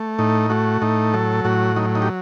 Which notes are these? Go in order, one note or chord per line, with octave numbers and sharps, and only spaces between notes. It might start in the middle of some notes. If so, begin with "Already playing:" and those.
Already playing: A3
A2 D#4
A3 F#4
A2 D#4
F#3 A4
A2 F#4
F#3 D#4
D#4
G4